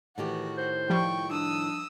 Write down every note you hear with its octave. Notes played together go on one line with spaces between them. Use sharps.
A2 D#3 E3 F#4 G4 F#5
C5
F3 G3 G5 C#6
D4 D#6 E6